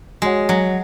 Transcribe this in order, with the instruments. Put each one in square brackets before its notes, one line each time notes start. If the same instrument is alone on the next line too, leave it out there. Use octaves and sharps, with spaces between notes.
[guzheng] G#3 [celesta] F#4 C#5 F#5
[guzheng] F#3